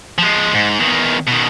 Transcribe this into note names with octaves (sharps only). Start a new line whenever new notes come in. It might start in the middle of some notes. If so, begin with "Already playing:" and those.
F3 G#3
G#2
E2 D#3
B2 D#3